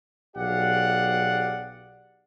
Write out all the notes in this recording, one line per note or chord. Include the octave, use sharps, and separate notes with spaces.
B1 G4 G#4 D5 F5 F#5